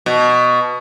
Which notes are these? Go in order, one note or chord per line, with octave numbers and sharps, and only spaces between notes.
B2